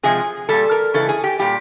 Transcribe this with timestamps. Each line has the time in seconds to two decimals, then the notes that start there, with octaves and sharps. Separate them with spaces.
0.03 C3 F3 G#3 G#4
0.49 A#2 G3 A4
0.71 A#4
0.94 C#3 E3 G#3 A4
1.09 G#4
1.24 G4
1.39 A#2 G3 G4